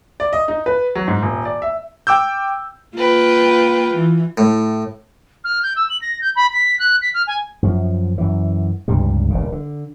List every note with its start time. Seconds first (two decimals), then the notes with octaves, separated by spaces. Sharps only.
0.20 D5
0.33 D#5
0.48 D#4
0.66 B4
0.95 F#3
1.08 G#2
1.22 D#1
1.45 D5
1.62 E5
2.07 G5 D6 E6 G6
2.97 A#3 F4 B4 G5
3.95 E3
4.38 A2
5.44 F6
5.63 G6
5.76 E6
5.90 F#7
6.02 A#6
6.21 G6
6.36 B5
6.53 B6
6.79 F#6
7.02 B6
7.14 F6
7.27 G#5
7.63 F#2 F3
8.18 F#2 E3
8.88 C#2 G2 C3 G3
9.30 D#1 D2 C#3
9.52 D3